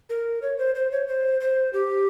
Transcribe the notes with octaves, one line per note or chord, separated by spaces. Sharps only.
A#4
C#5
C5
C5
C#5
C5
C5
G4